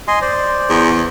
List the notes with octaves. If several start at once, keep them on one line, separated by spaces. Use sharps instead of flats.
D#5 G#5 C6
C5 D5
E2